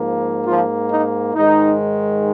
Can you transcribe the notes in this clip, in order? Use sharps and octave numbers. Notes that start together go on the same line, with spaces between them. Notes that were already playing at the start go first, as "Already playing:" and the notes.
Already playing: G#2 F3 A#3
F3 F4
D#4
G#2 D#3 G#3 D#4